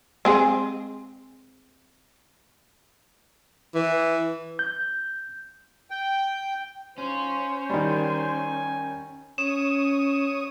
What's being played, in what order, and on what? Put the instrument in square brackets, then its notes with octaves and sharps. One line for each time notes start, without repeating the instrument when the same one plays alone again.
[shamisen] G#3 C4 G#4
[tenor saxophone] E3
[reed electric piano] G6
[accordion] G5
[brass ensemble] F#3 D#4 F4 [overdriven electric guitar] C#4 [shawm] C5
[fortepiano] D#3 G3 [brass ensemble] A#4 G#5
[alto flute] C#4 [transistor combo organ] C#5 D#6 [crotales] E7